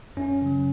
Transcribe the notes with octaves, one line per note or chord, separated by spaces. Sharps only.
F#2 C#4
C#3 F#3